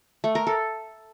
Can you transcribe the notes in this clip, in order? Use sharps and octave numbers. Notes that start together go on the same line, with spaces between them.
A3
A#4
A4